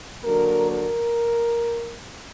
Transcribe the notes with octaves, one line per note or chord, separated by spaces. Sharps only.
D3 F#3 A#3 A#4
A#4